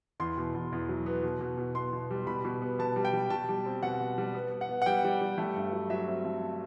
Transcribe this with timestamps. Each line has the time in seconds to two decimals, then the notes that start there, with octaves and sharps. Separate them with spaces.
0.20 E2 C6
0.38 B2
0.54 E2
0.72 E2
0.89 F#3
1.06 B3
1.23 B2
1.41 B2
1.58 B2
1.75 B3 C6
1.93 B2
2.11 G3
2.27 B2 B5
2.45 B2
2.62 B3
2.79 B2 A5
2.96 G3
3.05 G5
3.13 G3
3.30 B2 A5
3.49 G3
3.66 C4
3.83 B2 F#5
4.00 B2
4.18 G3
4.34 B3
4.51 B3
4.61 F#5
4.69 B3
4.82 F#5
4.86 G3 G5
5.04 G3
5.21 G3
5.38 A3
5.56 G2
5.73 F#3
5.90 F#3 E5
6.07 C4
6.24 A3